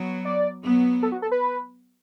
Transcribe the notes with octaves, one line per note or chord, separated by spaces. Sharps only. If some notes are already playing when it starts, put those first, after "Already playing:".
Already playing: F#3 B3
D5
F#3 B3
A4
F#4
A4
B4